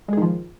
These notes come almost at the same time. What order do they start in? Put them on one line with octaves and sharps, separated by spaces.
G#3 G#4 D#3 F3